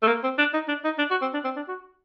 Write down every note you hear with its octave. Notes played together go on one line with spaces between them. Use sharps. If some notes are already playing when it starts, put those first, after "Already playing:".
A3
A#3
C4
D4
D#4
D4
D#4
D4
F#4
C4
D4
C4
D4
F#4